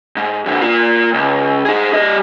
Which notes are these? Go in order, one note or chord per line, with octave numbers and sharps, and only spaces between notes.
G#2
F2 D3
A#3 F4
C#2
D#4 G#4
G3 D#5